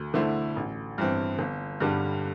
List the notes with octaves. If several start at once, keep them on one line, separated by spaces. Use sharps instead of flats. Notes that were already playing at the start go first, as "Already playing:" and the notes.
Already playing: D2
D3 A3 E4 C5
A1
G2 E3 C4
G1
G2 D3 G3